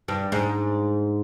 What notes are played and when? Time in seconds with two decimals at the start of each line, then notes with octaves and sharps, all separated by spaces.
0.08 G2
0.32 G#2